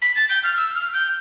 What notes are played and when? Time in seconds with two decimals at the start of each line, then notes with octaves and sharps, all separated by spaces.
0.02 B6
0.16 A6
0.29 G6
0.44 F6
0.57 E6
0.75 F6
0.94 G6